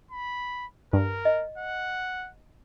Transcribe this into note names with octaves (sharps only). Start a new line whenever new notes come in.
B5
G2 A#4
D#5
F#5